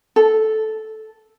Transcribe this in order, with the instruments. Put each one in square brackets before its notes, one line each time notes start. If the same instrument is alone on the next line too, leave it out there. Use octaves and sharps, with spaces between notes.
[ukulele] A4